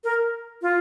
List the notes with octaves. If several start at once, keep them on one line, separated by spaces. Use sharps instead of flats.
A#4
F4